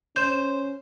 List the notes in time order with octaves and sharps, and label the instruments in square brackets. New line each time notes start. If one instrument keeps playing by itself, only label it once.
[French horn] C#4 [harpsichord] C5 [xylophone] G6 E7